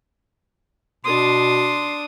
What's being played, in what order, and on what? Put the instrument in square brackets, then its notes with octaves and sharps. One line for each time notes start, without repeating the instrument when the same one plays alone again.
[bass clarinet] B2 [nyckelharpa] D4 D#6 [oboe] C6